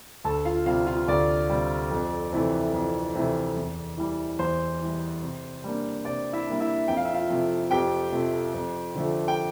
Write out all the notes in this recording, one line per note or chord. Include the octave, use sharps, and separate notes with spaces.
D2 A4 A5
F4 F5
C3 G3 F4 F5
F4 F5
D2 D5
C3 G3
F2
C3 E3 A3
F2
C3 E3 A3
E2
E3 G3
E2 C5
E3 G3
C3
G3 A#3 D4
C3 D5
E4 E5
G3 A#3 D4
E4 E5
F2 G5
F5
E5
F4 F5
C3 F3 A3
F2 G4 G5
C3 F3 A3
F2
D3 F3 A3
G5